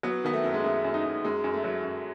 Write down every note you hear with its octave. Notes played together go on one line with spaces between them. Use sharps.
F#3 B3
D#3 B3
A3
F#2
G#3
F#2 A3
F#2
D#4
F#2
F#2 G#3
F#2
A3
F#3
F#2